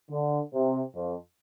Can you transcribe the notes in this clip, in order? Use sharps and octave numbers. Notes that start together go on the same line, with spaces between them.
D3
C3
F2